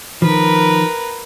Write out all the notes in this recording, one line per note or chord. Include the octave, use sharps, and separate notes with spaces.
D#3 F3 A#4 B4